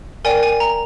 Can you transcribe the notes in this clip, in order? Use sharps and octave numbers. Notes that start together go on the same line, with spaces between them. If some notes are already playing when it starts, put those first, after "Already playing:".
A#4 D5 G5 G#5
G#5
A#5